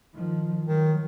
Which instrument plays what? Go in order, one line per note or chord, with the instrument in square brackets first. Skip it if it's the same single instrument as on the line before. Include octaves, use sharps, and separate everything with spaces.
[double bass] D#3 F3
[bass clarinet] D#3 [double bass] F3 F#3